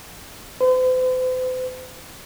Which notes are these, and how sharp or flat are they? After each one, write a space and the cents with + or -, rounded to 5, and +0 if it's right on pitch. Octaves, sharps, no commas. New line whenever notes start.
C5 -45